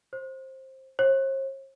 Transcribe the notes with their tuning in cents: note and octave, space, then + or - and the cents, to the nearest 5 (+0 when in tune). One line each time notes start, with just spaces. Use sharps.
C5 +15
C5 +45